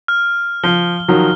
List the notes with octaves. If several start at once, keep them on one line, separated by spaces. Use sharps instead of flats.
F6
F3 G7
D#3 F3 F#3